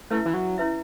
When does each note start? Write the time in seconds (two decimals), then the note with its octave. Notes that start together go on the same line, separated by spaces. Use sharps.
0.10 A3 C#4 E4 B4 E5
0.26 E3
0.34 F#3
0.58 C#4 E4 B4 E5